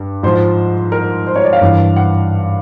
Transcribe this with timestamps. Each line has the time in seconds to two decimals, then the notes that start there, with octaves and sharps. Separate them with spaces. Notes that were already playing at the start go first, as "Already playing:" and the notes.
Already playing: G2
0.23 G#2 F3 C5
0.92 A#4
1.27 C5
1.36 C#5
1.44 D5
1.53 F5
1.61 G2 E3
1.96 F#5